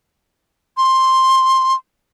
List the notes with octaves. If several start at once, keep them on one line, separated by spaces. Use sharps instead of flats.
C6